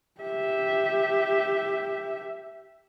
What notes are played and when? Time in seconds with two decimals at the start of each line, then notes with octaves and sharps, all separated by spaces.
0.21 G4 E5